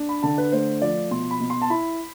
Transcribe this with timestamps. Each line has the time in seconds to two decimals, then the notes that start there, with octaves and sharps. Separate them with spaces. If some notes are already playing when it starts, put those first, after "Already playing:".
Already playing: D4
0.09 B5
0.23 D3 A5
0.38 B4
0.52 A3 C5
0.82 F3 D5
1.11 B2 C6
1.31 B5
1.40 B2
1.50 C6
1.62 A5
1.70 E4 B5